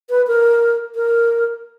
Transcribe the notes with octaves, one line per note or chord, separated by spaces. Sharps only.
B4
A#4
A#4